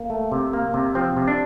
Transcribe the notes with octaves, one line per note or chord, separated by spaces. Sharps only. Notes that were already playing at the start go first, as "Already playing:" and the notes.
Already playing: A#3
A3
C3
A#3
C3
F3 C4
C3
D4